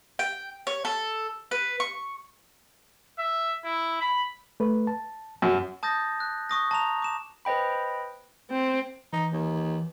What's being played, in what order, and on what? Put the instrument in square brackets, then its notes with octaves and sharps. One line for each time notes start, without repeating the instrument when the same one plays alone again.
[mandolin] G5
C#5
A4
B4
C#6
[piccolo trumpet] E5
E4
B5
[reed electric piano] A3 B4
A5
[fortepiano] F#2
[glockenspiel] A5 D#6 G6 A6 A#6
F#6
C#6 D#6 A#6
A5 A#5 F7
D6 E7
[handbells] B4 C5 D#5 G5 B5
[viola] C4
[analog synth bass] E3 [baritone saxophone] D#4
[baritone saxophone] D#2